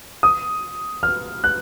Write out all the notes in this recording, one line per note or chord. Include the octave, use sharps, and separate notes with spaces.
D#6
F6
F#6